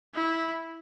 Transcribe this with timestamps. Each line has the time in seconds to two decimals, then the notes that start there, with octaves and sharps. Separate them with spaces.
0.15 E4